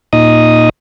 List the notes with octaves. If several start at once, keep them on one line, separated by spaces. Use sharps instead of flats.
A#2 D#4 D#5 D#6